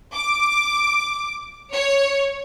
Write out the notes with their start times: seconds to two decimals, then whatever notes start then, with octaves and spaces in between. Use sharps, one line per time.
0.13 D6
1.72 C#5